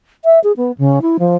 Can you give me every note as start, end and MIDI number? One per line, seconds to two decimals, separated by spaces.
0.25 0.39 76
0.44 0.52 68
0.57 0.72 59
0.78 0.99 49
1.02 1.17 64
1.19 1.37 53